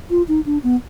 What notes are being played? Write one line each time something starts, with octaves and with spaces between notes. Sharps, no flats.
F4
D#4
D4
B3